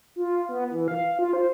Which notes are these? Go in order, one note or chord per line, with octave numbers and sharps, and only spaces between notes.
F4
B3
E3
F5
F4
C5